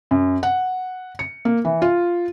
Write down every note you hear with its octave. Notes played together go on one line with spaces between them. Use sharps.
F#2
F#5
C#7
A#3
E3
F4